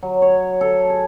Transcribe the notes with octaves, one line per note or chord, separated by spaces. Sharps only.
F#3
C#5
A4
G#4